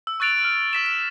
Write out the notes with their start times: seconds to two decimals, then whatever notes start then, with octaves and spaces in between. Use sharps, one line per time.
0.07 E6
0.20 C#6 F#6 A6 D7 F7
0.44 F6
0.73 E6 B6 E7
0.86 E7